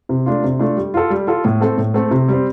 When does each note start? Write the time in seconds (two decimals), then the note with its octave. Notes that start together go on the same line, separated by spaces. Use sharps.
0.09 C3
0.26 A3 D4 F4
0.44 C3
0.59 A3 D4 F4
0.77 G3
0.94 F4 A4
1.10 G3
1.27 F4 A4
1.45 A2
1.60 A3 C4 A4
1.78 A2
1.94 A3 C4 A4
2.11 C3
2.28 G3 C4